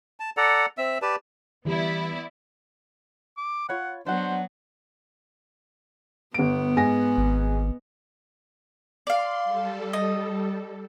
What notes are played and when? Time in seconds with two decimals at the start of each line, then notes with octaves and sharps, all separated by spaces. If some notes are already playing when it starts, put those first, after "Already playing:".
0.20 A5
0.37 A4 D5 F#5 A#5
0.78 C4 E5 E6
1.02 G4 B4 D5 A5
1.65 E3 G3 B3 E4 D5
3.38 D6
3.69 F4 C#5 F#5 B5
4.06 F#3 B3 D4 C5 F#5
6.34 G1 B3 D7
6.76 G#2 G#5 A#6
7.17 G#1
9.07 D5 F5 C6
9.44 G3 A4
9.93 D#5